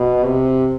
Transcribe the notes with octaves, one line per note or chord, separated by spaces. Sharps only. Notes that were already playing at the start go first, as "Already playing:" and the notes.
Already playing: B2
C3